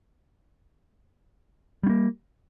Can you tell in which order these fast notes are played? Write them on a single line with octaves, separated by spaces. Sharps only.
G3 C#4 A#3